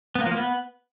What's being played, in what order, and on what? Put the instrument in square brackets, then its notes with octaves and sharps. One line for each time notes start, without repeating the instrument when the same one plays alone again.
[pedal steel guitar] B3
A#3
F3
A#3
B3